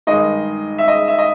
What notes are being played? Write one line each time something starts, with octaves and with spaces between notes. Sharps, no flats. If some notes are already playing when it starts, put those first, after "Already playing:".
G2 D#3 G#3 D#5
E5
D#5
E5
D#5